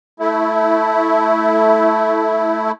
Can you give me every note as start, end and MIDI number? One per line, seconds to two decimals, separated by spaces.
0.20 2.72 57
0.20 2.72 64